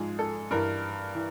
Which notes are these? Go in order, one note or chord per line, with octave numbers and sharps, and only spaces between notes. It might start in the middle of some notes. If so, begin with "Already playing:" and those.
Already playing: G#2 F3 G#4
A4
G2 E3 A#4
E3